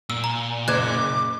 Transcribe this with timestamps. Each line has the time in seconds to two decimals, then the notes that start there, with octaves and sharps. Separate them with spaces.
0.10 A#2 E6
0.24 A#5
0.68 F#1 D6 F#6 G#6 E7